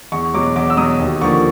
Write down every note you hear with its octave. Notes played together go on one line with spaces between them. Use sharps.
E2 C#6
B2 F#3 D6
E2 D6
E6
B2 F#3 D#6
D#2
D3 F3 A#3 C#6